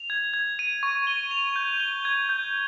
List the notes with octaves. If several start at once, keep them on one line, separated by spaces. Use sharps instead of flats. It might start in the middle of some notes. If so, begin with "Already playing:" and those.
Already playing: F7
G#6
G#6
D#7
C#6
G7
F7
G6
G7
G#6
G6